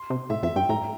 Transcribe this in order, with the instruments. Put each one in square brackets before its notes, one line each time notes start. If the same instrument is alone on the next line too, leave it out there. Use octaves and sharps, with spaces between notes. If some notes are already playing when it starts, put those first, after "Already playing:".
Already playing: [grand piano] C6
[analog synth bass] C3
[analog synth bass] A2 [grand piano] E5
[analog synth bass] F2 [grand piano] E5
[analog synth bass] G2 [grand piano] G5
[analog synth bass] A2 [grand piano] A#5